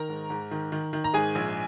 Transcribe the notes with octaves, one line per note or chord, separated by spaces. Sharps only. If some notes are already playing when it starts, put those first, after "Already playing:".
Already playing: D#3 A#4 A#5
G#2
G#2
D#3
D#3
D#3
A#5
G#2 G#4 G#5
A#1